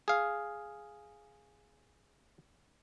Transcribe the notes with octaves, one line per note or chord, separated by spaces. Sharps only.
G#4 F5